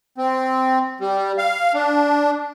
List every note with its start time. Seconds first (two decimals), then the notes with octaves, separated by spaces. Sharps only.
0.18 C4
1.00 G3
1.38 F5
1.75 D4